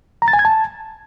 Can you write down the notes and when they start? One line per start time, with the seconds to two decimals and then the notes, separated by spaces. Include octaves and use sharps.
0.22 A#5
0.28 A6
0.33 G#5
0.39 G#6
0.45 A5